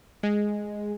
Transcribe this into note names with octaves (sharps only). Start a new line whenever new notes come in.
G#3